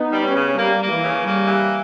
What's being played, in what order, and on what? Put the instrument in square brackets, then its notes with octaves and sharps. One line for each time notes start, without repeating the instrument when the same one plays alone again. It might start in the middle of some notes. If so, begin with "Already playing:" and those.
Already playing: [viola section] B3 D#4
[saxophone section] G3
[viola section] C#4
[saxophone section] C#3
[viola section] G3 [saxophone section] A#3
[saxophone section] A#3
[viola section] E3
[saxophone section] C#3
[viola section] G3 [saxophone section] A#3
[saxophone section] E3